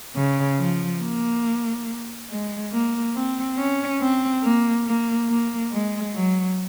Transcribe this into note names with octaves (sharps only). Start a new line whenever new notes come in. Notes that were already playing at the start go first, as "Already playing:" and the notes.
C#3
F3
A#3
G#3
A#3
C4
C#4
C4
A#3
A#3
A#3
G#3
F#3